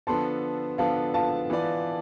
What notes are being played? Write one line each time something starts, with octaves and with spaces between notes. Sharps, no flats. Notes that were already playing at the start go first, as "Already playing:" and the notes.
D3 F3 B3 D4 A4 A5 C6
D3 F3 B3 D4 A4 F5 A5
F5 A5
E3 B3 F4 B4 D5